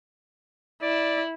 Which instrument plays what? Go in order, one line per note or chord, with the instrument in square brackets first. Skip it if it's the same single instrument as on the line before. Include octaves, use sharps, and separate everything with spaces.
[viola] E4 [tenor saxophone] D5